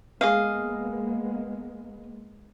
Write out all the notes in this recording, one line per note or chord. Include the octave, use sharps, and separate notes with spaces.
G#3 A#3 B3 G#4 D#5 F5